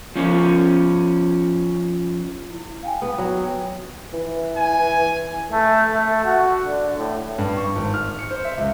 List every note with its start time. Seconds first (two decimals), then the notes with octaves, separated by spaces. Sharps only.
0.16 F3 C#4
2.51 E4
2.83 F5 G5 G#5
3.02 B3
3.18 F#3 G5
4.13 E3
4.57 G#5
5.51 A3
5.93 A3
6.25 F#4
6.65 D3
6.97 A2
7.38 G2
7.57 C#6
7.76 G#1
7.94 F6
8.19 C#7
8.31 C5
8.44 E5
8.57 C#2